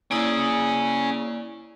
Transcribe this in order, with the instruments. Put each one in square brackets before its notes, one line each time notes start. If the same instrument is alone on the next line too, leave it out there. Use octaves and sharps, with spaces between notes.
[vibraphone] A#3 E4 D5 [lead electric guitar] C#4 G#4